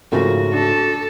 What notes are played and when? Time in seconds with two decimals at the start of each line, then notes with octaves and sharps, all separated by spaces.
0.12 G#2 C#3 F3 A3 C4 F#4 A#4
0.53 D4 A4